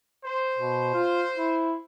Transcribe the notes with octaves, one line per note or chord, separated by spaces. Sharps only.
C5
B2
F4
E4